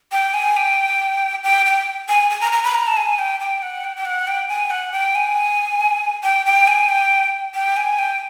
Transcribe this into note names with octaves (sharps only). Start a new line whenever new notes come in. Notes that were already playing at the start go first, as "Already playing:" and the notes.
G5
G#5
G5
G5
G5
G#5
G#5
A#5
A#5
B5
A#5
A5
G#5
G5
G5
F#5
G5
G5
F#5
G5
G#5
F#5
G5
G#5
G5
G5
G#5
G5
G5
G#5
G5